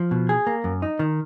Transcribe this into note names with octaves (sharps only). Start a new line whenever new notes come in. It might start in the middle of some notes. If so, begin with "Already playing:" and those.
Already playing: F3
B2
G#4
A#3
F#2
D#4
D#3